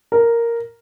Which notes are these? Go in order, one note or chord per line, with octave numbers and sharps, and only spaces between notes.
A#4